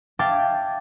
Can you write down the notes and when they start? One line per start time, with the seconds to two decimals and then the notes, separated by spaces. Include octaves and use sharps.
0.19 E5 F5 G5 A5 D6 G#6